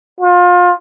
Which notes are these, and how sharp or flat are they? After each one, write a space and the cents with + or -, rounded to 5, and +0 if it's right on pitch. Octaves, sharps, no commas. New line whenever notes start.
F4 +30